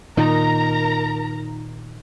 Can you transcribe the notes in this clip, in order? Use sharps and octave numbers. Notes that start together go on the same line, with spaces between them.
A#2 D#3 D#4 A#4 A#5